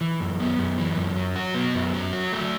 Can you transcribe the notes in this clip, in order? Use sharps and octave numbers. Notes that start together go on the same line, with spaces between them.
E3
F#2
B3
F#2
E3
F#2
F#3
F#4
B3
F#2
F#3
F#4
A3